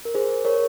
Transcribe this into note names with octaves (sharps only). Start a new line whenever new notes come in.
A#4
G#4 C5
A#4 C#5